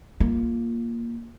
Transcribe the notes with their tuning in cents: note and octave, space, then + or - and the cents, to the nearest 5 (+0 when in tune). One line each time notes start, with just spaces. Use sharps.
A#3 +0 F4 +0